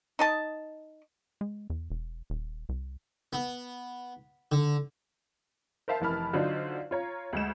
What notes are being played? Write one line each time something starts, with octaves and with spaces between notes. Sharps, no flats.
D#4 D#5 A5
G#3
E2
E1
D#1
C2
B3
D3
A#4 C5 E5 F5 A5
F1 E3 A#4 A5 B5 F6
D3 F#3 D#4 F4 C5
F4 C#5 A#5
D2 G#3 E7